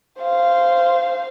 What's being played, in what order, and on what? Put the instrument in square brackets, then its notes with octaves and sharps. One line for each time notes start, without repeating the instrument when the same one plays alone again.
[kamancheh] C5 F5